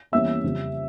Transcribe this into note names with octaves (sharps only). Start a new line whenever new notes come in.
E2 E3 G3 A#3 C#4 E5 E6
F2 C#3 G3 C#4